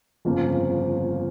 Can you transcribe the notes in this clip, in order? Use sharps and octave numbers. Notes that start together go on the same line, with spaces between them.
G1 F2 C#3 F3 A#3